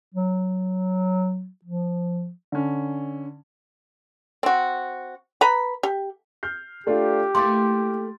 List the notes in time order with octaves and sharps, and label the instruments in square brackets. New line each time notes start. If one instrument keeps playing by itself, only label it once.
[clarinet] F#3
F3
[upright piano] D3 C#4
[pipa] C4 F#4
B4 A#5 B5
G4
[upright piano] F6 G6 C7
[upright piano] A3 D4 F4 [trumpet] G4
[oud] A3 A#3 E4 [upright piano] F5 D6 A6 [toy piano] C6